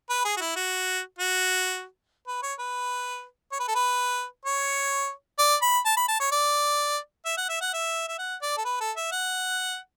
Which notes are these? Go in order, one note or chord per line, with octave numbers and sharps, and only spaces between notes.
B4
G#4
F#4
E4
F#4
F#4
B4
C#5
B4
C#5
B4
A4
B4
C#5
D5
B5
A5
B5
A5
C#5
D5
E5
F#5
E5
F#5
E5
E5
F#5
D5
A4
B4
A4
E5
F#5